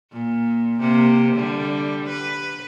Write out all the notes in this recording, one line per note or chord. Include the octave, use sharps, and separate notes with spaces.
A#2
C3 A#3
D3 G3
B4